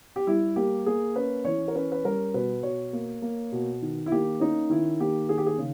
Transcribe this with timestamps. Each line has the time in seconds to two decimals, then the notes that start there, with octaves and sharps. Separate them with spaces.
0.16 G4
0.27 G3 E4
0.56 A#3 G4
0.86 A#3 G#4
1.16 C#4 B4
1.45 E3 C#5
1.68 A#4
1.75 C#4 B4
1.92 B4
2.04 G3 A#4
2.34 B2 B4
2.63 B2 C#5
2.93 A#3
3.22 A#3
3.52 B2
3.82 D#3
4.06 E4
4.12 A#3 G4
4.40 C#4 D#4
4.70 D#3 E4
5.00 A#3 G4
5.29 D#3 G#4
5.38 G4
5.46 G#4
5.58 C#3